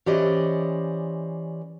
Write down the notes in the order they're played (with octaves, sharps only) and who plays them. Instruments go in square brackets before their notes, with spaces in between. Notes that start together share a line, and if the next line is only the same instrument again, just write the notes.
[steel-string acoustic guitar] E3 C#4 G4 C5 D5 D#5